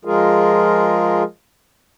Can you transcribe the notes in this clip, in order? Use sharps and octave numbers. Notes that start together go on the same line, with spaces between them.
F3 G#3 F4 G#4 A#4